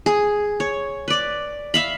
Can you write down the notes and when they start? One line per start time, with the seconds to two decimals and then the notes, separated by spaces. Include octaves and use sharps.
0.06 G#4
0.60 C#5
1.08 B4 D5
1.74 E5 F5 B5